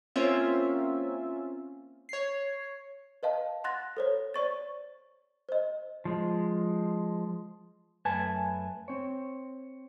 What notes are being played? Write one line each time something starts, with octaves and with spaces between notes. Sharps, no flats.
A#3 C4 C#4 F4 E5
C#5 C7
B4 D#5 F5 A5
F#5 C6 F#6 A6 A#6
A4 C5 C#5
C5 D5 C#6 A6
C5 D#5
F3 G#3
F#2 A3 B4 G#5 A5
C4 C#5